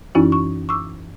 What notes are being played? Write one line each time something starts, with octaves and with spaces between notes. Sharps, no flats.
F#2 E3 C#4 D#4 E4 F#4
C#6
C#6 D6 E6